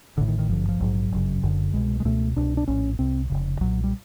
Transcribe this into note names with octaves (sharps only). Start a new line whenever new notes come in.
A1 A2 D3
D#3
D#3
G#1 G2 D3 F3
F3
A#1 G#2 F#3
G1 F#2 C#3
F#1 F#2 D3
C2 B2 G#3
G#3
C#2 B2 A3
C2 B2 D4
D4
A#1 A2 C#4
C2 C3 C4
F1 D#2 C#3
B1 A#2 F#3
G3